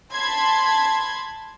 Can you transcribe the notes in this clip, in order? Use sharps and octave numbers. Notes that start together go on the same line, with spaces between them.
A5 B5 C6 G#6